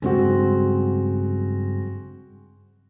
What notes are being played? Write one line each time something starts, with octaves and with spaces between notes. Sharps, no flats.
G2 C#3 F#3 G#3 C4 F#4